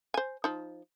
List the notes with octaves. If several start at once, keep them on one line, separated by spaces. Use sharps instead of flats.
C5 G#5
F3 D#4